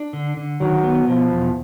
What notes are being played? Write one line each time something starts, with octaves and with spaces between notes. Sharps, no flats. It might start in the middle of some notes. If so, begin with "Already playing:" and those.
Already playing: D4
D3
D3
D#3 F#3
B3
B2 F3
E2